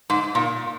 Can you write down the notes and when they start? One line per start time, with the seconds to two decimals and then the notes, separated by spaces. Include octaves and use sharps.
0.10 G#2
0.35 A#2